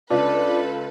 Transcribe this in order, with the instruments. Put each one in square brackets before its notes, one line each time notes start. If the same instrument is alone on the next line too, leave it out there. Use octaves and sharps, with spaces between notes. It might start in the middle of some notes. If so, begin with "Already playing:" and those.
[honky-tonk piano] C#2 F4 [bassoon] D4 [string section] A4 B4